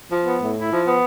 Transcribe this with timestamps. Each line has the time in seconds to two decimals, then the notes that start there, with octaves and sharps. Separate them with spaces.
0.10 F3
0.26 B3
0.41 A2
0.56 E4
0.70 F3
0.85 B3